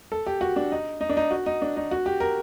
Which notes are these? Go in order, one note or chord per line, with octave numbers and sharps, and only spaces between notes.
A4
G4
F#4
D4
D#4
D#4
D4
D#4
F#4
D#4
D4
D#4
F#4
G4
A#4